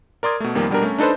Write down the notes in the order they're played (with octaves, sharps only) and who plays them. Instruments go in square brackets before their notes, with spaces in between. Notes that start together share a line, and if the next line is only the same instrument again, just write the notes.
[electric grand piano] A#4 D5 C6 D#6 G#6
B2 A3
F2 D#3 G3 A#3
B2 G3 D4 G4 A#4
A3 C#4
D4 D#4 A4 B4 C5